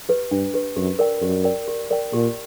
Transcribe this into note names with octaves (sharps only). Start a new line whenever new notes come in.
G4 B4
G2 D4
G4 B4
F#2 G4
A#4 D5 G5
F#2 G4
A#4 D5 G5
G4
A#4 D5 G5
A#2 G4